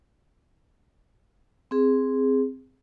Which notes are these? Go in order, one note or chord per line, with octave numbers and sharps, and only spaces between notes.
C4 G#4